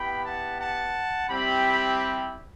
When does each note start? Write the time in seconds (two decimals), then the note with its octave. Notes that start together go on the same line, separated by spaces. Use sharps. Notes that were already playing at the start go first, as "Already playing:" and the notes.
Already playing: B3 E4 G4 G5 B5
0.23 F#5 A5
0.59 F#5 A5
1.28 G3 C4 E4 G4 G5 B5